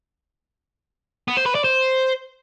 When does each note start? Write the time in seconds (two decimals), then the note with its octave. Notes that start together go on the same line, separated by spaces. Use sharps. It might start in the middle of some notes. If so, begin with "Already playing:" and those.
1.28 B3
1.37 C5
1.46 B4
1.55 D5
1.64 C5